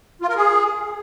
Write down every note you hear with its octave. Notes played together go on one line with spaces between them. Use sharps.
F4
A#4
G#4